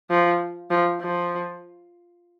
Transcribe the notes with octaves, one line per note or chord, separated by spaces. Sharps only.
F3
F3
F3